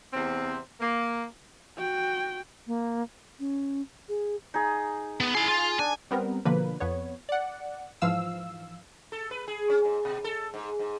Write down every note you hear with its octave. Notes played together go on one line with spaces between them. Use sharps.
E2 C3 C4
A#3
F#4 G5
A#3
C#4
G#4
D#4 G#4
B3
E4 G#4 C6
F4
D4 G#5
G3 B3 C4 A#4
B2 D3 F3 A#3 B4
F2 B3 C#5
D5 F#5
G#2 E3 F3 F5 E6
A4
B4
G#4
C#4
G#2
B2
A4
G#2
G#2